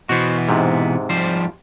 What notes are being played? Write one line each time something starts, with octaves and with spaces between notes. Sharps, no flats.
B2 E3 B3 F#4 C5
G#2 C3
F3 G3 C5